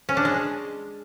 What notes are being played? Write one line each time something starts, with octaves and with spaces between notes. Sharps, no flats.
C#4
D4
G#3